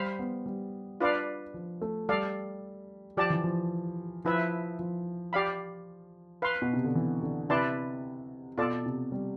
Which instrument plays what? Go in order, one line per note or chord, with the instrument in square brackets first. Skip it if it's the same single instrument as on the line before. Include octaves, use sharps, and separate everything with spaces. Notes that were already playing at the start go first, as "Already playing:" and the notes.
Already playing: [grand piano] G3 [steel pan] C5 F5 B5
[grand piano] B3
G3
[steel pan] D4 F4 B4 D5 F5
[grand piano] F3
A3
[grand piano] G3 [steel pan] A4 D5 F5
[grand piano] F3 [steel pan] G4 D5 A5
[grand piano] E3
F3
[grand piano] F3 [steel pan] E4 B4 E5
[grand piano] F3
[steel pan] G4 D5 F5 B5
B4 F5 C6
[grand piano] B2
C3
D3
E3
D3
[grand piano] C3 [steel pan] E4 B4 D5 A5 C6
[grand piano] B2 [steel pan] F4 A4 D5 A5
[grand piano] C3
G3